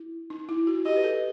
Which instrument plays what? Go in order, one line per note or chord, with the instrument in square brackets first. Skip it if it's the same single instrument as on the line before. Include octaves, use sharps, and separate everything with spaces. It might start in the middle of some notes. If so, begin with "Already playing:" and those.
Already playing: [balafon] E4
D#4
E4
F#4
[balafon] G4 [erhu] D#5
[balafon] B4
A4